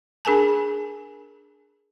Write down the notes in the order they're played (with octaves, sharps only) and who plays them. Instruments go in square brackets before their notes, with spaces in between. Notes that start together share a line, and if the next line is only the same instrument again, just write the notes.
[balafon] D4 G#4 A#4 G#5 A5